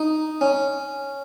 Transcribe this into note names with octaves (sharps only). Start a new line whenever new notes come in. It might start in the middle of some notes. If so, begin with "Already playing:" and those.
Already playing: D#4
C#4